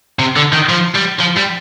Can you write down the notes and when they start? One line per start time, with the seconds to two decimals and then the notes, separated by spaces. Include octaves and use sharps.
0.19 C3
0.36 D3
0.53 D#3
0.69 F3
0.95 G3
1.19 F3
1.36 G3